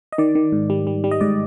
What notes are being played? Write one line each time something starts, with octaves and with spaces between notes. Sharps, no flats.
D#5
D#3 D5
D#3
G#2
G3
G3
G3
D#5
G#2 D5